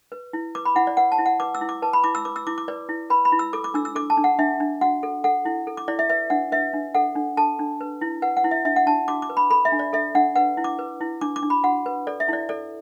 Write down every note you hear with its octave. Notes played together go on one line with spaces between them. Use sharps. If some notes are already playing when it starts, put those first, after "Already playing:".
B4
E4
B4 D6
B5
E4 F#5
D5
B4 F#5
A5
E4
F#5
B4 D6
E6
E4
D6
B4 A5
B5
E4 D6
E6
B4 D6
E6
E4 D6
D6
B4 D5
E4
B4 B5
B5
E4
E6
A4 D6
D6
D4 E6
E6
A4 D6
A5
D4
F#5
D4 E5
D4
F#4 F#5
A4
A4 F#5
E4
A4
D6
E4 D5
E5
B4 E5
D4 F#5
B4 E5
D4
A4 F#5
D4
A4 A5
D4
B4
E4
B4 F#5
F#5
E4
E5
D4 E5
F#5
D4 A5
F#4 D6
D6
B4
B5
A4 B5
E5
D4
D5
A4 E5
D4 F#5
B4 F#5
E4
D6
B4
E4
D4 D6
D6
D4
B5
F#4 F#5
B4
A4 D5
E5
E4 D5
A4 D5